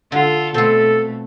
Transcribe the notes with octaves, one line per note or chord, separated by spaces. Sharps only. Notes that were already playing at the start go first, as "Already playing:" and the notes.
D3 F4 A4
B2 A3 C4 F4 A4